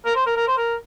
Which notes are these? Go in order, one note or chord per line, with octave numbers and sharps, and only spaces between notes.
A#4
C5
A#4
A#4
C5
A#4